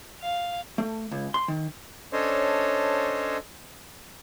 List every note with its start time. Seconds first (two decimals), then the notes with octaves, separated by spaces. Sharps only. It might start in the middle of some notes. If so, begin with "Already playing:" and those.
0.20 F5
0.78 A3
1.11 C#2
1.34 C6
1.48 D#3
2.13 C#4 D4 A4 C5 C#5 D#5